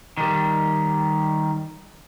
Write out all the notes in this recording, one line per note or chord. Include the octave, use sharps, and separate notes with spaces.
D#3 G3